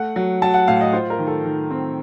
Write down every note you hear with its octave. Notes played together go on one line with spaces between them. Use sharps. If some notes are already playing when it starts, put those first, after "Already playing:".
Already playing: A3 F#5
F#3
F#3 A5
F#5
A2 F5
D#5
F4 C5
A#4
D#3
A4
D#3
C4